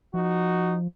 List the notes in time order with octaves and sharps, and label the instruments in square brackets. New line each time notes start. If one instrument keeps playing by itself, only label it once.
[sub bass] F3 [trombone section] D#4 F#4